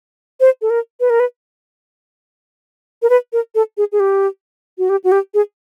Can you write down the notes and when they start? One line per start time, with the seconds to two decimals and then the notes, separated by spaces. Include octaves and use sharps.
0.40 C5
0.62 A4
0.70 A#4
1.00 B4
1.10 A#4
1.20 B4
3.02 A#4
3.10 B4
3.33 A#4
3.55 A4
3.77 G#4
3.92 G#4
4.00 G4
4.78 F#4
4.89 G4
5.04 F#4
5.12 G4
5.34 G#4